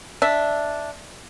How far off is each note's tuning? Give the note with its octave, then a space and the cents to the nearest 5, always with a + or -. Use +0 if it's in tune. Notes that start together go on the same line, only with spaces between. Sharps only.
D4 +0 E5 +0